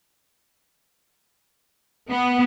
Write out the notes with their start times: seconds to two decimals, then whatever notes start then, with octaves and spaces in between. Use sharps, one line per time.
2.09 B3